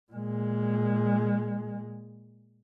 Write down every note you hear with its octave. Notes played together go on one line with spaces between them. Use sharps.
A#2 G#3